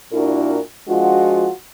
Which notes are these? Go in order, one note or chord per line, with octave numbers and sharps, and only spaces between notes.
A#2 D4 E4 F#4 A#4
F3 G#3 D4 F4 F#4